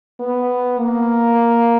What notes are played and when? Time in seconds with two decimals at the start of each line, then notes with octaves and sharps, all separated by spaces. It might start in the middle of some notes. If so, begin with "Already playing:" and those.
0.20 B3
0.79 A#3